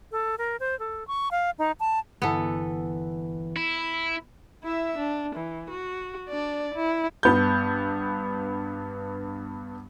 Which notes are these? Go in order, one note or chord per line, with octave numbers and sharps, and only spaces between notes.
A4
A#4
C5
A4
C#6
F5
D#4
A5
G1 E3 B3 A4
E4
E4 E5
D4
E3
F#4
D4 D5
E4
G2 B3 G6